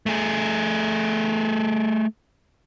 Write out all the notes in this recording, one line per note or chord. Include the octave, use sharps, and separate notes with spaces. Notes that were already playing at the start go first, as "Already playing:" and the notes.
A3 G#4